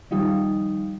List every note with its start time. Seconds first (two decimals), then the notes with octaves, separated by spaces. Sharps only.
0.11 D#3 F3 G3 D#4